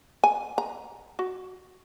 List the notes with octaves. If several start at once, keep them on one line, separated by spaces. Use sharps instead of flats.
G#5
A#5
F#4